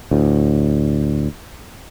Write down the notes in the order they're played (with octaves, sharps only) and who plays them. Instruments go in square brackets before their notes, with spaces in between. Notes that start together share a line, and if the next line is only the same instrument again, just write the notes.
[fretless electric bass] D2 A2